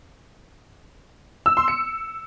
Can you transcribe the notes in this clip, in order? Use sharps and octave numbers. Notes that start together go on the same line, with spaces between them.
E6
C6
C#7